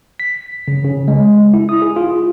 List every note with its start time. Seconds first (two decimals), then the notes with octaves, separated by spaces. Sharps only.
0.20 B6
0.68 C#3
0.84 C#3
1.08 G#3
1.54 E4
1.69 D#6
1.82 G#4
1.96 F4